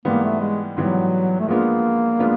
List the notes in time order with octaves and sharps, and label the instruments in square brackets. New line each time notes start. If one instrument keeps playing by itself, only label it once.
[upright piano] G#2 E3 G3 B3 [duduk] A#3
[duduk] A3
G#3
[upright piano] G#2 E3 G3 B3 [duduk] F#3
[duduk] A3
[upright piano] F3 G#3 B3 D4 F4 [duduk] A#3
[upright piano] F3 G#3 B3 D4 F4